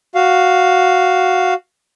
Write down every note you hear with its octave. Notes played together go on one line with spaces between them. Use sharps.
F#4 F5